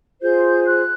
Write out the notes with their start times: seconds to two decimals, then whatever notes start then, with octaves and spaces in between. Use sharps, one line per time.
0.21 F4 G#4 C5 G6
0.65 F#6